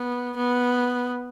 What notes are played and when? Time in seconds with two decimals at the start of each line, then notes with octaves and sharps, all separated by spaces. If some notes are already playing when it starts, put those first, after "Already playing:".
Already playing: B3
0.37 B3